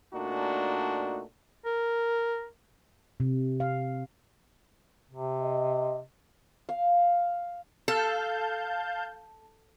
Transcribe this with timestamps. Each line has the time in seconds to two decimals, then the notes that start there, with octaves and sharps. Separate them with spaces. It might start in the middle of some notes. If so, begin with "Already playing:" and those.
0.14 A#2 A3 D4 D#4 F#4
1.65 A#4
3.20 C3
3.60 F5
5.11 C3
5.42 D#5
6.69 F5
7.88 A4 F5 A5 G6